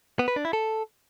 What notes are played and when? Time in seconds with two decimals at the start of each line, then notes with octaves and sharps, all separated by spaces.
0.19 B3
0.28 B4
0.36 D4
0.45 E4
0.53 A4